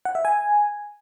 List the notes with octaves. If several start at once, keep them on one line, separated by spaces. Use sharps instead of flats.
F#5
E5
G#5